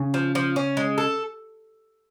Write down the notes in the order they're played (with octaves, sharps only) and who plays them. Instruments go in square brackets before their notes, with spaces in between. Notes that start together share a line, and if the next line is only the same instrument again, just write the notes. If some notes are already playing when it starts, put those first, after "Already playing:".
Already playing: [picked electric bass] C#3
[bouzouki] F3
F3
C#4
G#3
A4